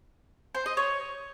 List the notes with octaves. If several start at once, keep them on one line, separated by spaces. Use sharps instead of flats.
C5
D#5
C#5